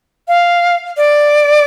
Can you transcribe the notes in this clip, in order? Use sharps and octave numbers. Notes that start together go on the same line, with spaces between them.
F5
D5